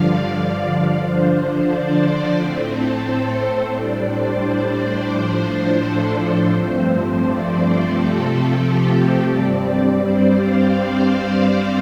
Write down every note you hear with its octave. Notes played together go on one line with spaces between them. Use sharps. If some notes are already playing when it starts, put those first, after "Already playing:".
Already playing: G2 D3 F3 D5 F5
D5
D5
D3 F3 D4 C5
D5
A2 A3 C4
A4
C5
A2 G3 D4 D5
C5
A2 F3 D4
A4
A4
G2 F3 A3 C4 C5
D5
D5
C3 F3 A3 C4 A4
A4
G4
G4
G2 G3 C4 D5
C5
F5